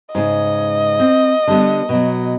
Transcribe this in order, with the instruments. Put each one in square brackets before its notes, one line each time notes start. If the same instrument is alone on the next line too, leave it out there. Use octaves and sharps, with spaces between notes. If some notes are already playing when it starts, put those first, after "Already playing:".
[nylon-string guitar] G#2 C#3 [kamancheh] D#5
[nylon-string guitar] C4
D3 G3 B3
B2 F#3